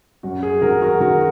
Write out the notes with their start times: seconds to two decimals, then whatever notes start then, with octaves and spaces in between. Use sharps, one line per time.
0.23 F#2 F#4
0.43 G#4
0.61 D#3 F#4 A#4
0.81 F#4 A#4
1.00 D#3 F#4 A#4